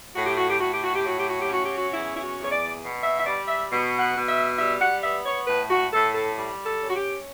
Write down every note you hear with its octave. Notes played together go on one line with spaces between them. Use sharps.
A2 F#4
G4
F#4
G4
A2 F#4
G4
F#4
G4
F#3 F#4
G4
F#4
G4
C#4
F#4
G4
F#4
E2 E4
E4
F#4
E2
C#5
D5
B2
E5
E5
G3 D5
E5
B2
F#5
B2
E5
G3 E5
F#5
B3 E5
C#5
A2 B4
F#4
A2 A4
A4
G3
A4
C#4
F#4
G4